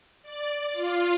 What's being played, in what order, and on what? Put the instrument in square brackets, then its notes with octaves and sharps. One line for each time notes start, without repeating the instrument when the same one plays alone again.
[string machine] D5
F4